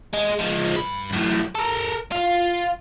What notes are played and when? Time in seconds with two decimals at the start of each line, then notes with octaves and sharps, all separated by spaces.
0.14 G#3
0.40 F3 G#3
0.76 G2 B5
1.13 F#2 A2
1.55 A4 A#4
2.12 F4